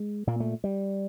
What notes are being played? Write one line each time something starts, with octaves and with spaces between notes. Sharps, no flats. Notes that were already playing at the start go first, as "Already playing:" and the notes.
Already playing: G#3
A#2 A#3
A3
G3